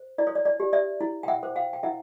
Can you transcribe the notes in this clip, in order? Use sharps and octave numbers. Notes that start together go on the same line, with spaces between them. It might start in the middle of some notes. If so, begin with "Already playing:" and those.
Already playing: C5
E4 D5
C#5
D5
D5
G4
D5 E5
E4
G5
E5 F#5
C5
F5 G5
G5
E4 E5 F#5